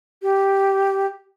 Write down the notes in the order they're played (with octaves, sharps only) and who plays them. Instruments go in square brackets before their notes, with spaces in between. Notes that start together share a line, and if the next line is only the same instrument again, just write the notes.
[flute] G4